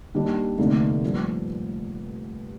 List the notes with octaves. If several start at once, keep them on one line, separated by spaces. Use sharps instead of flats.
D#2 D#3 G3 D4
F1 D#2 D3 A3 D#4
G2 F3 A#3